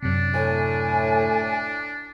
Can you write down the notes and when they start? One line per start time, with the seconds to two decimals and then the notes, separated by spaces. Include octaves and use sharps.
0.03 F#2 C3 D4
0.34 A2 G#5